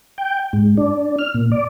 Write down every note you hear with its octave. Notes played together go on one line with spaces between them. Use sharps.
G5
G#2
D4
F6
A#2
D5